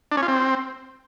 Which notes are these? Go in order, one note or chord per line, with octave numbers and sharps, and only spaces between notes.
D4
C#4
F4
C4